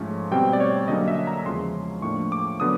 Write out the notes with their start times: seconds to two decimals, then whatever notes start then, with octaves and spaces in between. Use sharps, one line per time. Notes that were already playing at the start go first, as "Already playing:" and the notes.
Already playing: G#2 F3 A3 C#4
0.31 B2 G3 C4 G5
0.53 D5
0.60 C#5
0.88 D3 F#3 A#3 C#4 D#5
1.08 E5
1.27 A#5
1.46 E2 C#3 F3 G#3 C#4 C6
2.02 A2 F3 A#3 D4 C#6
2.32 D6
2.60 D3 F#3 B3 D#6